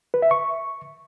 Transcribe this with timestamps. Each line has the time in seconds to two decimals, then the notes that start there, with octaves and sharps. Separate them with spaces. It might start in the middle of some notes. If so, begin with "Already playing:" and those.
0.14 B4
0.22 E5
0.31 C#6